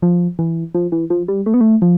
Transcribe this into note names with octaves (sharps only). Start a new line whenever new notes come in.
F3
E3
F3
E3
F3
G3
A3
B3
A3
F3